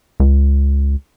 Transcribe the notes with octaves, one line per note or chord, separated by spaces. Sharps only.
C#2